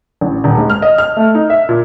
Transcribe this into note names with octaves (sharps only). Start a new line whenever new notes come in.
A1
D#1
G#2
F6
D#5
F6
A3
D#4
E5
A#2